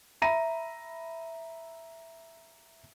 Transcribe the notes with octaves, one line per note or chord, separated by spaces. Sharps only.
E5 A#5 B5 A#6 D#7